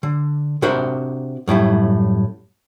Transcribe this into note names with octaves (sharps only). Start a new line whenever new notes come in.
D3
C3 D4 F#4 A#4 C5 B5
F#2 A2 G3 E4